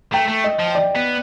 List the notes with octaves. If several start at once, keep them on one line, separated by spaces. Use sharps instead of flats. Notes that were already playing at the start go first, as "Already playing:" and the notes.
A3 G5
A3
D#5
F3
D5
B3